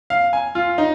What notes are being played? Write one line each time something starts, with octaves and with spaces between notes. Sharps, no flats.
F5
G#5
F4
D#4